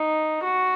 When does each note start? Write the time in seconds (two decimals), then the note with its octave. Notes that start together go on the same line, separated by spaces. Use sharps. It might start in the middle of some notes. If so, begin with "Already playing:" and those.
Already playing: D#4
0.44 F#4